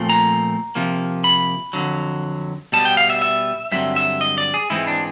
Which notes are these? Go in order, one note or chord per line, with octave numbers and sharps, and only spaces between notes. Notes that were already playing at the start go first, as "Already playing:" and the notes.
Already playing: A#2 F3 A3 C4
A#5
C3 F3 A#3
B5
F2 D3 F#3
B2 G3 B3 A5
G5
F5
E5
E5
G2 D3 F#3 C4 E5
E5
D#5
D5
G#4
G#2 E3 G#3 C4 E4
D4